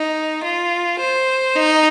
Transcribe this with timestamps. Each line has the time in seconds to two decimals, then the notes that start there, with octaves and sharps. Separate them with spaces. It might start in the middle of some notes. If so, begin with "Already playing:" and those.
Already playing: D#4
0.43 F4
0.99 C5
1.55 D#4